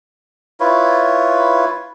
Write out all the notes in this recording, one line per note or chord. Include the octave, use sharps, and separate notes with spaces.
E4 F4 B4 C#5